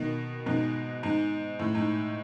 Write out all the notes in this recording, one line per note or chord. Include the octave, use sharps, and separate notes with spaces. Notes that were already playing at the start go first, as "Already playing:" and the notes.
Already playing: B2 D#3
G#2 B2
G#2
A2
G#2